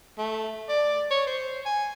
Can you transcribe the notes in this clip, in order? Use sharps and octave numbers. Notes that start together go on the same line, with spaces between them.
A3
D5
C#5
C5
G#5